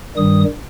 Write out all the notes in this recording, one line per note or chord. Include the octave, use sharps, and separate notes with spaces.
G2 D#3 G3 D#6